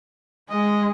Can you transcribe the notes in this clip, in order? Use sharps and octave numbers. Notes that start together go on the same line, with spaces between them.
G#3 D#5